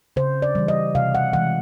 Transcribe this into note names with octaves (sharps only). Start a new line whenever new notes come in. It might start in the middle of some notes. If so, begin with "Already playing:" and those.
C#3 C5
D5
E3 G3
D#5
C3 F5
F#5
E3 G#3 F#5